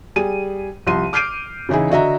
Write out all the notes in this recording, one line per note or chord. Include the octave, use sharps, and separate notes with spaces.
G3 G#4 D#7
C2 F3 G4 C6 D#7
D6 F6 G6 C7 D7 D#7
C#3 E3 D#4 E4 G#4
D3 F#4 D#5 E5 A#5